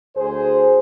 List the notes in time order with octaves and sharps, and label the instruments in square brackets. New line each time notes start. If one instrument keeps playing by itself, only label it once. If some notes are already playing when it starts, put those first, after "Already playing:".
[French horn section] D2 G#4 C5